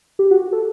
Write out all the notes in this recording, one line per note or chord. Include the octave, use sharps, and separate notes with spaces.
G4
F#4
A4